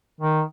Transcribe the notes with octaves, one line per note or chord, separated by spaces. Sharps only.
D#3